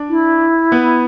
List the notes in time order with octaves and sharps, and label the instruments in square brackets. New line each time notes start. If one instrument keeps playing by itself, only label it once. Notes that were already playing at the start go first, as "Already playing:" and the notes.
Already playing: [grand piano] D4 D5
[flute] E4
[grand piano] B3 B4